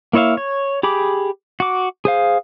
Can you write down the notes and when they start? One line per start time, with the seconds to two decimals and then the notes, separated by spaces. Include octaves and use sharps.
0.13 A#3 E4 C#5 E5 F5
0.37 C#5
0.83 G4 G#4 B5 D6
1.60 F#4 D6
2.05 G#4 C5 F5